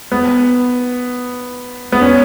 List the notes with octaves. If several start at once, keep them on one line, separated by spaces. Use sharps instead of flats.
B3
B3
C#4